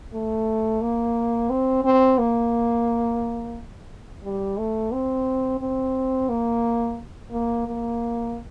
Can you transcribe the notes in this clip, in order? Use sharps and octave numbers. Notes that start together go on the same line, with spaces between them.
A3
A#3
C4
C4
A#3
G3
A3
C4
C4
A#3
A#3
A#3